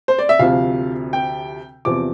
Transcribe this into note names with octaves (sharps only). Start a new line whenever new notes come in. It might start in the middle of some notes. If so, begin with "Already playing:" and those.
C5
D5
E5
D2 C3 F3 F5
G5
E2 C3 F3 D6